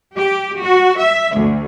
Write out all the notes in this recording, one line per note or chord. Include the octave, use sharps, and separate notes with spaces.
G4
F#4
E5
D2